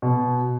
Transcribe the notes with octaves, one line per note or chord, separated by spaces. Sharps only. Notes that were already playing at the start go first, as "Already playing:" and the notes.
B2